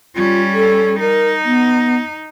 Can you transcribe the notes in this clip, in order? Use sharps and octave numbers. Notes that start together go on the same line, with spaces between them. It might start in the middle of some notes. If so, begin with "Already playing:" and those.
G3 C#4 F4
A4
D#4 A#4
B3